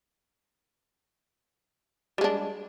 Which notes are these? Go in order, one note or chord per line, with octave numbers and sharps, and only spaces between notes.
G3 G#3 D4